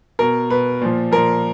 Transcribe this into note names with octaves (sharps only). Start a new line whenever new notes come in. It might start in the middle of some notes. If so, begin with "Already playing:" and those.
B2 A#4
B2 B4
A#2 F3
A#2 F3 A#4